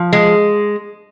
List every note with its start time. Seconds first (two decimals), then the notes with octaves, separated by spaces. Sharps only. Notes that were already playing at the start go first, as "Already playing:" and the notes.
Already playing: F3
0.13 G#3